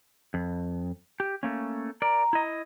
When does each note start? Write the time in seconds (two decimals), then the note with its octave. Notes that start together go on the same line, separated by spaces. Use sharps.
0.34 F2
1.20 G4
1.43 A3 A#3 C#4
2.02 A#4 D5 A#5
2.33 E4 D#5